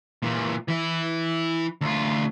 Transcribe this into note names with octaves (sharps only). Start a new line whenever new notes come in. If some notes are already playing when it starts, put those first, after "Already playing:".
A#2 E3
E3 E4
D2 F4